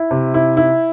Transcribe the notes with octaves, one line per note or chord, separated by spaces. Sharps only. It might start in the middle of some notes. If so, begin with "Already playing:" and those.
Already playing: E4
C3
E4
E4